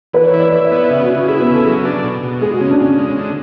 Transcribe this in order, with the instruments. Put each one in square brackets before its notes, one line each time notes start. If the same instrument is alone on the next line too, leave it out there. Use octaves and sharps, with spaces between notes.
[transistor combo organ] E3 [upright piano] B4
[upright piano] C#5
[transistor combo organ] E4
[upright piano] D5
[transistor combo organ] E4 [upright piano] D5
[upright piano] E5
[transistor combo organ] B3
[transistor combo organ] C#3 [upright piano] E5
[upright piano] F#4
[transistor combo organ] C#3
[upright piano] F#4
[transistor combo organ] E4 [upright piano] G#4
[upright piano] B3
[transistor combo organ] C#3
[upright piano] A4
[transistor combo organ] F#3 [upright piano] G#4
[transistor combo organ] D4
B2
B2
[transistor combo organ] G#3 [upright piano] G#4
[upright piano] F#4
[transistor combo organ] C#3 [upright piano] C#4
[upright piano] D4
[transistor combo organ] C#3 [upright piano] C#4
[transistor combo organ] G#3
D3